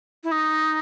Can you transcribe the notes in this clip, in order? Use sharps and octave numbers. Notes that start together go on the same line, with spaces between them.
E4
D#4